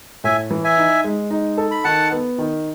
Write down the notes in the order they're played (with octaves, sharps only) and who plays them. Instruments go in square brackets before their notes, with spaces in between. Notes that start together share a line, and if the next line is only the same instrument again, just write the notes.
[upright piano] A2 [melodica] E5 G#5
[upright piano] E3
[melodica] E5 G#5
[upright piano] D#4
G#3
D#4
A4
[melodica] B5
[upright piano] D#3 [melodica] F#5 A5
[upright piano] B3
D#3